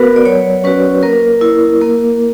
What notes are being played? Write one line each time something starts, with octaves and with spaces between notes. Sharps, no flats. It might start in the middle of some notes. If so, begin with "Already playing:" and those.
Already playing: B3 F#4 A#4 B4
D5
F#3 C#5
C#4 F#4 B4
A#3 A#4
E4
A#3